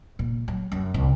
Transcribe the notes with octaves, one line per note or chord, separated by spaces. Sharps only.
A#2
F#3
F#2
C2